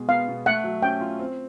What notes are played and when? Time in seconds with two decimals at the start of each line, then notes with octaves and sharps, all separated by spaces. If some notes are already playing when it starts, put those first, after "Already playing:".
Already playing: B2 G#3 G#4
0.09 B3 F5
0.28 B2
0.46 A3 F#5
0.64 F#3
0.83 C#4 G5
1.01 F4
1.19 C4